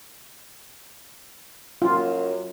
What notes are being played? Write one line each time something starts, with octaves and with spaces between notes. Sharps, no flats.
F#2 F4